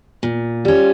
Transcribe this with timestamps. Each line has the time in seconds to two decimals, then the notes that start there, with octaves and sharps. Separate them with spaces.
0.23 A#2
0.65 G3 C#4 F4